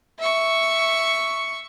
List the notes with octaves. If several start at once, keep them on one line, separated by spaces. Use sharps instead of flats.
E5 C#6